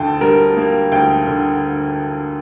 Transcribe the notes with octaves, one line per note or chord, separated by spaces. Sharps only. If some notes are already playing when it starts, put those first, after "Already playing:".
Already playing: D2 D3 G5 A5
G3 A#4
A#3
D2 G5
D3